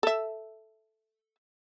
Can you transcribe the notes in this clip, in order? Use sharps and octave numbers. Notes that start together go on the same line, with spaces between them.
A4 E5